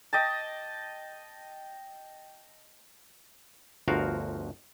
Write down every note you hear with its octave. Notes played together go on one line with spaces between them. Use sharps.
D#5 G5 A5
G1 D2 F3 F#4 A#4 F5